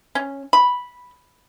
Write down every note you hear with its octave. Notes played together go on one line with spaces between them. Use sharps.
C#4
B5